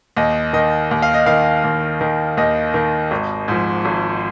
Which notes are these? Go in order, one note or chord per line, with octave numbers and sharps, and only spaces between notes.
D#2 D#5
D#3 D#5
D#2
F5
D#5
D#3 F5
D#2
D#3
D#2 D#5
D#3
G#1
G#2 F3
G#1